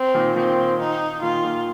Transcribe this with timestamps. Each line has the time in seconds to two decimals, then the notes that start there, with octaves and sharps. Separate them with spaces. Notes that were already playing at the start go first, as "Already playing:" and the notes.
Already playing: C4
0.14 A#2 D#3
0.36 A#2 D#3 C4
0.79 D#4
1.22 A#2 D#3 F4
1.44 A#2 D#3